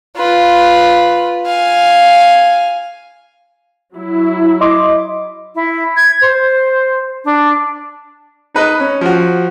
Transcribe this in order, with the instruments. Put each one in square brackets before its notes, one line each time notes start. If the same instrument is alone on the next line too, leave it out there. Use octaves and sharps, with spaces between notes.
[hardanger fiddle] F4 B4
F5 G#5
[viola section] F#3 E4
[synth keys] D#5 C6 D6
[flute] E4
G#6
C5
D4
[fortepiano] D#4 B4 D#5
C#4
F3 F#4